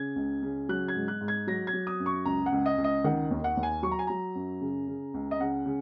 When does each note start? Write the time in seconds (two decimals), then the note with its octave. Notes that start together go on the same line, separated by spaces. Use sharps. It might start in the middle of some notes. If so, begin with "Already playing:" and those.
Already playing: C#3 G#6
0.16 C#2
0.43 C#3
0.69 F#3 F#6
0.88 G#6
0.95 G#2
1.08 F#6
1.21 G#2
1.28 G#6
1.47 F#3 A#6
1.67 G#6
1.74 F#3
1.87 D#6
2.00 F#2
2.06 C#6
2.25 C#2 A#5
2.46 F#5
2.52 C#2
2.66 D#5
2.78 C#2
2.84 D#5
3.04 D#3 F#5
3.31 D#2
3.44 F#5
3.57 D#2
3.63 G#5
3.82 F#3 C#6
3.91 A#5
3.99 G#5
4.07 F#3 A#5
4.35 F#2
4.61 C#3
4.87 C#3
5.14 C#2
5.31 D#5
5.40 C#3 F#5
5.66 C#3